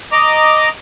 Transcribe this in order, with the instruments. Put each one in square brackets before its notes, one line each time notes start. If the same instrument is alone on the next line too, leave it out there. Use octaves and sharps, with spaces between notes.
[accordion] D#5 A#5 D6